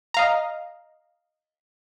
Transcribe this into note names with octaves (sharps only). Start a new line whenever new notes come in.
D#5 F5 A#5